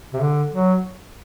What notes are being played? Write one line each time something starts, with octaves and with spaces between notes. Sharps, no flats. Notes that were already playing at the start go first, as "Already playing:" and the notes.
C3
D3
F#3